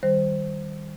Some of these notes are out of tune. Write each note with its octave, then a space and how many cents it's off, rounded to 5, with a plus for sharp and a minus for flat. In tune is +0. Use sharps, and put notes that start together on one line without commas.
D#3 +0 G3 +0 C5 +0